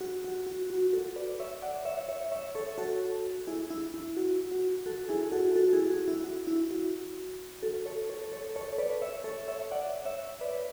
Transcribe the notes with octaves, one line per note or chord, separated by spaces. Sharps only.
F#4
F#4
F#4
F#4
F#4 A4
B4 D5
C#5 E5
D5 F#5
C#5 E5
C#5 E5
C#5 E5
A4 C#5
F#4 A4
E4 G#4
E4
E4
F#4
F#4
F#4 A4
E4 G#4
F#4 A4
F#4 A4
E4 G#4
F#4
E4
F#4
E4
F#4
F#4 A4
A4 C#5
A4 C#5
A4 C#5
A4 C#5
C#5
B4 D5
C#5 E5
A4 C#5
C#5 E5
D5 F#5
C#5 E5
B4 D5